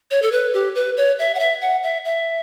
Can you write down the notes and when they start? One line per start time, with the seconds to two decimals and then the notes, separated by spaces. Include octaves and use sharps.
0.11 C#5
0.22 A4
0.32 B4
0.54 G4
0.75 B4
0.97 C#5
1.19 E5
1.35 F#5
1.39 E5
1.61 F#5
1.83 E5
2.05 E5